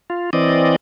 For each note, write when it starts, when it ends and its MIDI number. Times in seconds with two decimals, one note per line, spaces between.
0.10 0.30 65
0.33 0.76 52
0.33 0.76 60
0.33 0.76 74
0.33 0.76 75